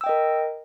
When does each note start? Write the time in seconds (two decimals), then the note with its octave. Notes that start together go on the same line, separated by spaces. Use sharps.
0.01 E6
0.04 G5
0.06 D#5
0.09 A#4